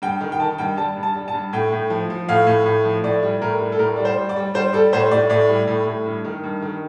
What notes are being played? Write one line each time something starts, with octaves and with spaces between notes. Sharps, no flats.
G2 G5
D#3
G5
D#3 A5
G2 G5
G3 A5
G2
A5
G3
A5
G2
A2 G5
A2
F3
F3
A2 F5
A2
A2
F3
A2 D5
G3
A2 A#4
G3
A4
A2 A#4
G3 D5
C5
G3
D5
G3
G3 C5
G3 A4
A2 C5
A2 D5
A2 D5
G3
A2
A2
G2
D#3
G2
D#3